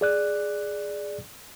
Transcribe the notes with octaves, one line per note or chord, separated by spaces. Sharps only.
G#4 D5 F#6